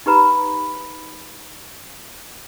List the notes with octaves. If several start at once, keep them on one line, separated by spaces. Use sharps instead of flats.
D#4 G4 B4 A#5 B5